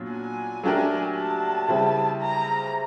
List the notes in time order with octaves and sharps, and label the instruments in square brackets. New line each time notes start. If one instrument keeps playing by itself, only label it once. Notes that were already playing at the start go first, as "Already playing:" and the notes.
Already playing: [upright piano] A#2 F#3 B3 D4 F4
[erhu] G#5
[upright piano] F#3 A3 D4 G4 A#4
[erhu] A5
[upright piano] C#3 E3 G3 C4 E4
[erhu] A#5